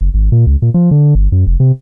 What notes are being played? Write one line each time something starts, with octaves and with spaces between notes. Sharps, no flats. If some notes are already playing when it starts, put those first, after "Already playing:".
F#1
G#1
A#2
C#2
A#2
F3
D3
G1
F#2
F1
C3